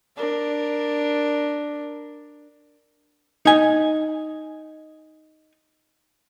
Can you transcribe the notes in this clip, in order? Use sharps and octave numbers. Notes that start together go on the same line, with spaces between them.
D4 A#4
D#4 G#5